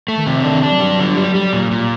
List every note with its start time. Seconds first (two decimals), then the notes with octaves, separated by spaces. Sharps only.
0.08 A3
0.18 D#3
0.27 C3
0.45 D#3 D4
0.63 D4
0.72 F#3
0.80 G3
0.99 D3
1.17 G3
1.35 G3
1.53 A#2
1.71 A#2